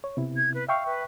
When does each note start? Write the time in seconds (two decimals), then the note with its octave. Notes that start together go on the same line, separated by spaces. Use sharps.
0.04 C#5
0.17 C3 B3 E4
0.37 G#6
0.54 B4
0.69 E5 F5 G5 C#6
0.86 B4